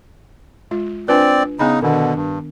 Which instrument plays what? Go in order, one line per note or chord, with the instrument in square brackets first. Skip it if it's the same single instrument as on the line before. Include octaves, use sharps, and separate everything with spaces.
[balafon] G#3 F4
[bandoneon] C4 D5 [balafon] D4 F4 B4
[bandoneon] C#3 D#4 [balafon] B3 G#5 B5
[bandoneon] B2 D3 [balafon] D#3 D4
[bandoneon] G2